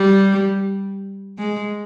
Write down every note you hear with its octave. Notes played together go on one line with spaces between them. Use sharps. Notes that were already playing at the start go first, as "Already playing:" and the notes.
Already playing: G3
G#3